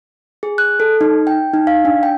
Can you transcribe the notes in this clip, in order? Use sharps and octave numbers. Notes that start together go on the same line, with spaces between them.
G#4
F#6
A4
D#4
G5
D#4
F5
D4
G5